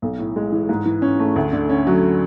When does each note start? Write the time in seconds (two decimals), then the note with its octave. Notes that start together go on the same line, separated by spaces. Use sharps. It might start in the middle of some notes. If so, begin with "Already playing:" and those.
0.02 B1
0.18 A2
0.36 G#3
0.52 E3
0.69 G#2
0.85 E3
1.02 C#4
1.19 A3
1.36 D2
1.53 D3
1.69 C#4
1.87 F#3